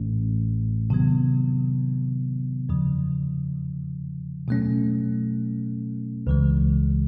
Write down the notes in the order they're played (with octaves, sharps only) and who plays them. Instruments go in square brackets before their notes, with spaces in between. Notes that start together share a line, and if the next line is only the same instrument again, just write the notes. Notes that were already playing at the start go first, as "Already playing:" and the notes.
Already playing: [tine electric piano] A1 A2 E3 A3 C#4
C3 D#3 F#3 B3
E2 C#3 F3
B2 F#3 A3 C#4
C#2 C#3 E3 G#3